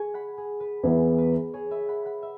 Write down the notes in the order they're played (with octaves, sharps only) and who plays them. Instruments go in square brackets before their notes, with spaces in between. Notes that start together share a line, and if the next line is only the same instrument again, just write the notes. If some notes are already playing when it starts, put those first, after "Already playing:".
Already playing: [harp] G#4 G#5 C#6
F#5 B5
G#4
B4
[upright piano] E2 E3 B3 E4 [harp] G#4
[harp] B4
G#4 C#5
B4 E5
F#5 B5
F#5 B5
E5